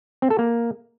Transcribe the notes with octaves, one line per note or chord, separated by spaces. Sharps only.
C4
A4
A#3